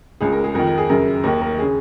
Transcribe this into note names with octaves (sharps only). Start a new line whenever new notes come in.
C#2 C#3 G#4
A#4
G#4
F2 D#3 A#4
A#4
G#4
F#2 C#3 A#4
D#2 D#3 A#4
A#4
C#3 G#4